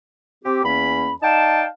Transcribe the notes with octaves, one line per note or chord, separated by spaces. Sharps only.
C4 G4
E2 A#3 C#4 B5
D#4 D5 F5 G5 A5